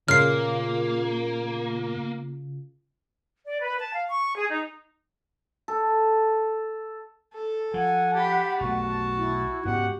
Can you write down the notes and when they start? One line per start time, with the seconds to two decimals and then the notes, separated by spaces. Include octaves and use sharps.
0.08 A#2 C#3 A#3 F4 F6 C7
3.45 D5
3.60 B4
3.79 A5
3.92 F5
4.09 C#6
4.36 G#4
4.48 D#4
5.68 A4
7.33 A4
7.74 F3 F#5 G#5
8.13 G4 A5 B5
8.61 B1 B2 A3 F#4
9.18 E4
9.65 G#2 B3 C#4 G4 F#5